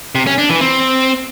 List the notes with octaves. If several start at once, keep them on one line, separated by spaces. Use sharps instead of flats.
C3
C#4
D4
E3
C4